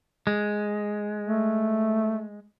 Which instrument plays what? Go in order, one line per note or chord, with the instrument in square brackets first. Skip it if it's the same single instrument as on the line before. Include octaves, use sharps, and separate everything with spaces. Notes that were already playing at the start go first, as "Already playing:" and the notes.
[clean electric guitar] G#3
[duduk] A3